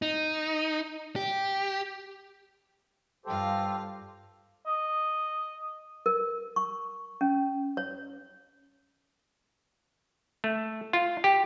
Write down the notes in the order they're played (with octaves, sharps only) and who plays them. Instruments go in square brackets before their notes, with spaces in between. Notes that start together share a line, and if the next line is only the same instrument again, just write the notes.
[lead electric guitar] D#4
G4
[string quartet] G2 F4 F5 [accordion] G4 A4 C5
[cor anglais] D#5
[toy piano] A#4
C#6
C#4
C#5
[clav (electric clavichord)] A3
F4
G4